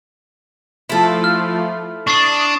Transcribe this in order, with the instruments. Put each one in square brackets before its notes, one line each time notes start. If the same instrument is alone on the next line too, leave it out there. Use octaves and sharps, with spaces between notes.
[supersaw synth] F3 A3 F4 [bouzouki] E4 A4
[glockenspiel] F6
[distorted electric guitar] D4 [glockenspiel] C#6 A6 C7 [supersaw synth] D#6